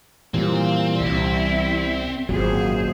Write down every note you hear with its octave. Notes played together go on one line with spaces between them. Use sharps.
A#2 E3 G3 C4
C2 E4
G#1 F#2 A#2 F#3 G#4 C5